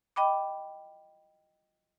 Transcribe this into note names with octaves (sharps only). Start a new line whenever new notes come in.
D#5 G5 B5 D6